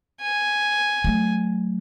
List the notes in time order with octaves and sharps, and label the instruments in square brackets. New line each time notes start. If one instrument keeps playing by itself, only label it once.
[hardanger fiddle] G#5
[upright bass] F#3 A3